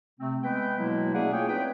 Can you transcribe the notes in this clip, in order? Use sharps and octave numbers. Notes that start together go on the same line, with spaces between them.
C3 A3 C4
G#3 B3 B4 G5
B2 F#3 G#3 A#3 E4
A3 A#3 C#4 G#4 D5 F#5
F4 G#4 C#5 G5
C4 D#4 B4 G5